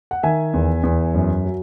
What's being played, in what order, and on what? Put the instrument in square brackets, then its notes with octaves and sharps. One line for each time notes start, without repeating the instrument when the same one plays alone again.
[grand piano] F#5
D#3 E5 G#5
E2
E2
F#2
F#3